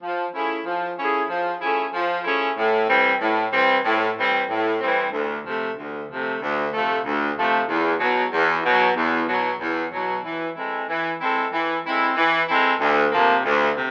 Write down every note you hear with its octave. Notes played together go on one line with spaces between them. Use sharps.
F3
A3 C#4 E4 G#4
F3
A3 C#4 E4 G#4
F3
A3 C#4 E4 G#4
F3
A3 C#4 E4 G#4
A2
E3 G3 C4
A2
E3 G3 C4
A2
E3 G3 C4
A2
E3 G3 C4
D2
C3 F3 A3
D2
C3 F3 A3
D2
C3 F3 A3
D2
C3 F3 A3
E2
B2 F#3
E2
B2 F#3
E2
B2 F#3
E2
B2 F#3
E3
G#3 C4 E4 A4
E3
G#3 C4 E4 A4
E3
G#3 C4 E4 A4
E3
G#3 C4 E4 A4
D2
C3 F3 A#3
D2
C3